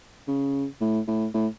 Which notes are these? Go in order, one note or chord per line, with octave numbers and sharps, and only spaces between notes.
C#3
A2
A2
A2